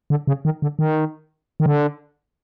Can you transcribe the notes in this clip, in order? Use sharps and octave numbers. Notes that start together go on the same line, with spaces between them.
D3
C#3
D#3
D3
D#3
D#3
D3